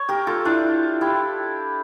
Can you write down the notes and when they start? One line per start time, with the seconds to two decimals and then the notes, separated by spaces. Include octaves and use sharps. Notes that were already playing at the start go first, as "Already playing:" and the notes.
Already playing: C#5
0.08 G4 A#4
0.27 F4 A4
0.45 D4 E4 F4
1.01 E4 G4